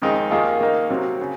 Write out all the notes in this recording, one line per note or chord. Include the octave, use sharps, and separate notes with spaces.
F2 D#3 G#3 C4 D#4
D#2 D#3 A#3 F4 G#4
D#3 A#3 D#4 A#4
C3 F#3 C4 F#4
C#3